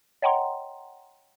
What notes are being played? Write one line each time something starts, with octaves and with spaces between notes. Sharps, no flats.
C#5 D#5 F#5 G5 A#5 C6